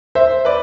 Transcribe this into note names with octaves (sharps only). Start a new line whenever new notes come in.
C5 E5
B4 D5